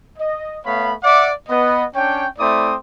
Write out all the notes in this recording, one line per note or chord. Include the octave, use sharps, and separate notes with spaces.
D#5
A3 B3 C#5 F5 B5
D5 E5 F#5 D6
B3 D#5
C#4 D4 C#5 G5
A3 C4 E4 D5 D6 D#6